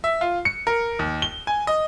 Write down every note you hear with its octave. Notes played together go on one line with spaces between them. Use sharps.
E5
F4
C#7
A#4
D#2
G7
G#5
D#5